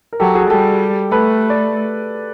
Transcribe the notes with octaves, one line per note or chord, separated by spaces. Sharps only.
A#4
F#3 G4 A4
F#4 G#4
G3 G4 A4
A3 A4 B4
D5